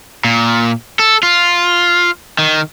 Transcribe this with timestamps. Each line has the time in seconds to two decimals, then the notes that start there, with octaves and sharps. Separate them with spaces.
0.24 A#2
0.99 A4
1.23 F4
2.39 D#3